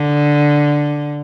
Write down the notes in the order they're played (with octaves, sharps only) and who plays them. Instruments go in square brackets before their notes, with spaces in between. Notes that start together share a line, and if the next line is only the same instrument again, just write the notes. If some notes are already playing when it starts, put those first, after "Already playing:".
Already playing: [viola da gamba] D3